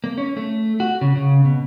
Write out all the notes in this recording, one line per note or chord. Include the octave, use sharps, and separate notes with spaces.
A#3
C#4
A3
F#4
C#3
C#3
B2